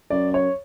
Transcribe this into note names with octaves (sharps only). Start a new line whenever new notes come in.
F#2 D5
C#5